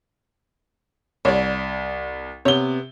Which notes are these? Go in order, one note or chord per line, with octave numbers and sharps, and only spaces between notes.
C2 C#5 D5
C3 B3 C#5 G7